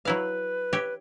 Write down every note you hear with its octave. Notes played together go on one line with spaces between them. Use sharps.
F#3 E4 B4 F5
G4 C#5 E5